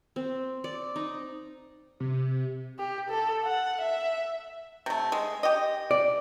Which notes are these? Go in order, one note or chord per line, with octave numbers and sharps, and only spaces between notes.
C4
D5
D#4
C3
G4
A4
F#5
E5
C3 A3
G#3
G4 D#5
D5